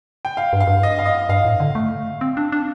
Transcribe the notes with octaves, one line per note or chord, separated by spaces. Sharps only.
G5
F5
G2
F5
G2
D#5
F5
D#5
G2 F5
A2
D3
A3
C4
D4
D4